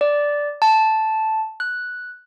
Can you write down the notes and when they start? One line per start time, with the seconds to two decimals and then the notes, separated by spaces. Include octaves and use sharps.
0.01 D5
0.62 A5
1.60 F#6